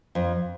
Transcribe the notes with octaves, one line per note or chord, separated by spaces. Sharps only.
F2